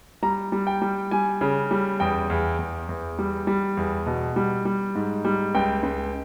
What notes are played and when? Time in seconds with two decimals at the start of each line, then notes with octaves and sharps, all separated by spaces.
0.22 G3 A#5
0.52 G3
0.67 G5
0.82 G3
1.11 G3 G#5
1.41 C#3
1.71 G3
2.00 E2 G5
2.30 E2
2.59 E2
2.89 E2
3.19 G3
3.47 G3
3.77 E2
4.06 B2
4.36 G3
4.65 G3
4.95 G#2
5.25 G3
5.54 C#2 G5
5.83 C#2